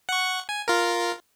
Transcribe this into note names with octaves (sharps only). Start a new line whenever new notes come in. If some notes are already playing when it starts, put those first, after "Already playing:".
F#5 C#6
G#5
F4 A#4